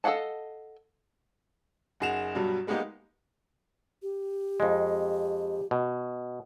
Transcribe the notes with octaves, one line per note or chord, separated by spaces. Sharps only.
A4 D#5 F5 F#5 A5
F#1 D#4 G#4 F#5 E7 F7
G2 B2 F#3 G3
G3 G#3 A#3 B3 D#4 G4
G4
F2 G#3
B2